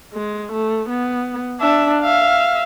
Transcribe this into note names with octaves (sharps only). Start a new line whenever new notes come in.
G#3
A3
B3
D4 E5
E5 F5